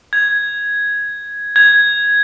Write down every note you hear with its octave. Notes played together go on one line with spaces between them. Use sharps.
G#6
G#6